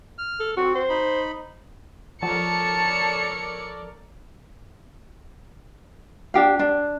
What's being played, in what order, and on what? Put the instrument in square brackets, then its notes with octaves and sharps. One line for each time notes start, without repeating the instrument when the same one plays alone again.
[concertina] F6
[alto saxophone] A4
[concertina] C4 [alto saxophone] F#4
[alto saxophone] C5
[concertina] D#4 B5
[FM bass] F3 [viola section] A4 A#4 D5 [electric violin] C#5 C#7 [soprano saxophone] A5
[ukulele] D4 G4 F5
D4